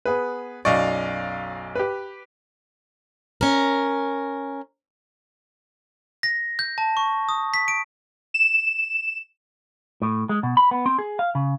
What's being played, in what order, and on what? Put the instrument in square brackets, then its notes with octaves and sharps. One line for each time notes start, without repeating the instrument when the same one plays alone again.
[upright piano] B3 G#4 B4
[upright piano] B1 F#2 C#6 [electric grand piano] D5 D#5 F5
[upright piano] G4 B4
[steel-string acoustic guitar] C#4 A#4
[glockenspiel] A#6
G6
A5
C#6
D#6
B6
D7
[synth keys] E7
[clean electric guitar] A2
G#3
B2
B5
B3
C4
G#4
F5
C#3